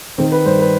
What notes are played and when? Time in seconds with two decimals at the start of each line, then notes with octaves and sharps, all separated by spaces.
0.18 D#3 C4
0.32 B4
0.45 G2 C5
0.59 B4